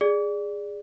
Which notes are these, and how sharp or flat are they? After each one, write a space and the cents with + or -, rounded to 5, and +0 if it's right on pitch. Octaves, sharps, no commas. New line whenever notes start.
G#4 -15 D5 +0